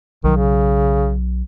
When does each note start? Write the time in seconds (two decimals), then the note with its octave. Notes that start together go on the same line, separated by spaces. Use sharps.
0.24 B1 D#3 F#3
0.36 C#3